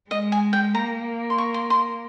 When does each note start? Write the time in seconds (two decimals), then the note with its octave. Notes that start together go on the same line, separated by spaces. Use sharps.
0.10 G#3 D#5
0.32 G#5
0.53 G5
0.74 A#3 A#5
1.30 C6
1.38 C#6
1.54 C6
1.70 C6